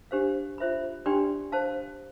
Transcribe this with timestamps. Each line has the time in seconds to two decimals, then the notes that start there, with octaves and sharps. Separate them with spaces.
0.11 D4 G4 C5 F5
0.58 F4 C5 E5 B5
1.06 D4 G4 D5 G5 C6
1.52 C5 F5 A5